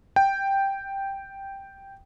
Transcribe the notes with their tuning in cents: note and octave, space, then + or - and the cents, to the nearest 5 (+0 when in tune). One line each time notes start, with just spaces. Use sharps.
G5 +0